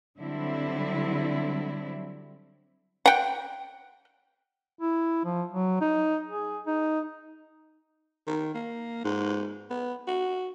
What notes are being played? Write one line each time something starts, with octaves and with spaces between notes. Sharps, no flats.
D3 F#3 G3 C4 E4
F#5 G5
E4
F3
F#3
D#4
G#4
D#4
D#3
A#3
G#2
B3
F#4